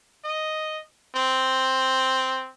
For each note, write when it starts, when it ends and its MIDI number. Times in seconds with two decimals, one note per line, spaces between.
0.24 0.80 75
1.16 2.50 60